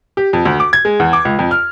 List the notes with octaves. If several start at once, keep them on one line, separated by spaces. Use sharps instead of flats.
G4
F2
D2
D6
G#6
G#3
E2
D6
C#2
F2
F6